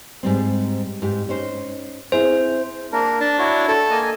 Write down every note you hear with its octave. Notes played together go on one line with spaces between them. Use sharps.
G#2 G3 C4
G#2 G4
C#4 D#4 C5
C4 E4 G#4 C5
A#3 D4 A#4
D4 A5
E4 F#4 C#5
A4
A#3 D#5 G#5